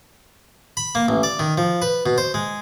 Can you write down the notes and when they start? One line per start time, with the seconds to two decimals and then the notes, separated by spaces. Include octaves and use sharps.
0.77 B5
0.95 A#3
1.08 A1
1.23 D5
1.39 D#3
1.58 F3
1.82 B4
2.06 B2
2.18 C5
2.34 G#3